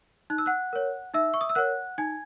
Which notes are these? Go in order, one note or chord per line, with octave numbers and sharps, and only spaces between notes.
D#4 F#6
E6
F#5 F#6
A#4 C#5
D#4 E5 E6
C#6
D#6
E6
A#4 C#5 F#5 F#6
D#4 G#5 G#6